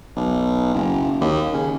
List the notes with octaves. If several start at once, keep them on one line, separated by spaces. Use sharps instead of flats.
B1
F#1
D#2
C#3